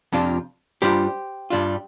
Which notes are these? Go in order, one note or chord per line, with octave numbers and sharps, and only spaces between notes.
F2 C3 F3 D4 F4
G2 G3 D4 F4 G4 C5
G2 G3 D4 F4